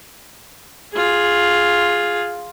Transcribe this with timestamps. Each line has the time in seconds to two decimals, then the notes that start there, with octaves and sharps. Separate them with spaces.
0.94 F4 G#4